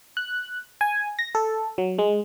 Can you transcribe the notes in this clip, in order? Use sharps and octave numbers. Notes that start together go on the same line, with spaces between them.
F#6
G#5
A#6
A4
F#3
G#3